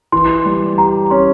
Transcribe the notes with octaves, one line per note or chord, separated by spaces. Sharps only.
E3 C6
G3
G4 A#5
C#4 C6